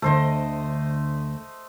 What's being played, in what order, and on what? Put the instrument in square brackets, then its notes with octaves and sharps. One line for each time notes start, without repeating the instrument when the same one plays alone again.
[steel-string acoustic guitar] D2 D3 [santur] A3 C5 D#5